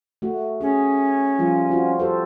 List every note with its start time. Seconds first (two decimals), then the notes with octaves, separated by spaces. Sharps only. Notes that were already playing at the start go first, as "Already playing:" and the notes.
0.22 A3 F#4
0.61 C#4 G#4
1.39 F3 G3 F4
1.69 C4 F4 F#4
1.99 G4 A4 C5